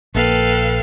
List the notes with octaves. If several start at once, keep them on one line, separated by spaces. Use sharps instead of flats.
A#1 A#3 A4 B4 F5 G5